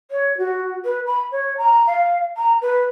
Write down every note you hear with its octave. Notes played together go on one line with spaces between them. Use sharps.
C#5
F#4
B4
B5
C#5
A#5
F5
A#5
B4